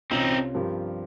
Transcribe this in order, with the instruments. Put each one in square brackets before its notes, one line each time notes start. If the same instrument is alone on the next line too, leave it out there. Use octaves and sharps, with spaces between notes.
[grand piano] C2 C3 G3 C#4 F4 [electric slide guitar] C4 D#4
[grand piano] G2 F3 C4 G4 A#4